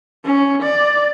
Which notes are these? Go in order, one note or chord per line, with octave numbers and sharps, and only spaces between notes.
C#4
D5